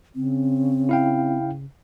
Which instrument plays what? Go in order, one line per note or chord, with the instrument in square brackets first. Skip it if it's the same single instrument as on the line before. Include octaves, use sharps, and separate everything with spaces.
[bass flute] C#3 [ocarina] C4
[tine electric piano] E4 F5 G5